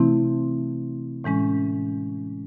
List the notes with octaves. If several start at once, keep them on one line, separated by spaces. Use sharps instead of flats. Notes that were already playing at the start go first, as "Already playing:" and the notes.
Already playing: C3 E3 A3 C4 E4
A2 E3 G#3 C#4